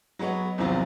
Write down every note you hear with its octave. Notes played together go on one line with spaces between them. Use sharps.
F#3 G#3 B3 C#5
B1 E2 C3 D#3 F3 F#3